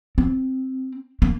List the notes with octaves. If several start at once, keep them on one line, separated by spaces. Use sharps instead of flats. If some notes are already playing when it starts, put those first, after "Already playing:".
C4
A#3